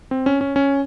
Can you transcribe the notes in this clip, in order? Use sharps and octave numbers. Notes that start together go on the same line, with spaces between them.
C4
C#4
C#4
C#4